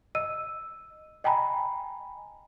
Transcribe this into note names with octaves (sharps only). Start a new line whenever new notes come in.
D#5 E6 D#7
D#5 G5 G#5 A#5 B5